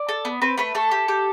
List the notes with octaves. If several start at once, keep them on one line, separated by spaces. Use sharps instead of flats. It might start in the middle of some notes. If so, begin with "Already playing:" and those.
Already playing: D5
A4
B3
C4 B4
A3 B4
A3 A4
G4
G4